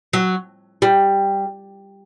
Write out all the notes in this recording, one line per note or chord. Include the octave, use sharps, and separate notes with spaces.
F#3
G3